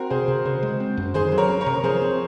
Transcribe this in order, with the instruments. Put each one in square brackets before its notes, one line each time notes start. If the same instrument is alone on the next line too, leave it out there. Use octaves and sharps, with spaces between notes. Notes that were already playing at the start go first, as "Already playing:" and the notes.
Already playing: [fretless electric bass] C4 [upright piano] F#4 A#4
[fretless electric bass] C3 [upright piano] G#4 C5
[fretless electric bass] C3
[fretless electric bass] C#3 [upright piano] G#4 C5
[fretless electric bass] G#3
C4
F#2
[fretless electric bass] D#3 [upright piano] G#4 C5
[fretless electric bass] F#3
[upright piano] A#4 C#5
[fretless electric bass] C#4
[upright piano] A#4 C#5
[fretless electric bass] C3
[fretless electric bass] F3 [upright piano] G#4 C5
[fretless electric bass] C4